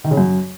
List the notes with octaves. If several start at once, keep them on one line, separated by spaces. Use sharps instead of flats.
D#3
C#3
F#2